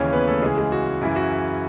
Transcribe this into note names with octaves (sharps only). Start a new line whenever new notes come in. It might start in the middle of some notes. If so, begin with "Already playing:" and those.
Already playing: D#2 C#3 E3 C#4 C#5
B3 B4
A3 A4
C#2 C#3 E3 G#3 G#4
G#3 G#4
F#4
F#2 C#3 E3 E4
F#4